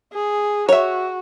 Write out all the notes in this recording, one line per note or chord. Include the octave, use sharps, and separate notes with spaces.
G#4
F#4 C#5 E5